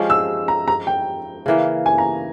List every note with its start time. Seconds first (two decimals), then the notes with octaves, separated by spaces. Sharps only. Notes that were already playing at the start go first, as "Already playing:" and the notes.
Already playing: F3 G#3 C#4 G4
0.10 E6
0.48 A#5
0.68 A#5
0.87 G5
1.46 C#3 E3 A#3
1.86 G#5
1.98 A#5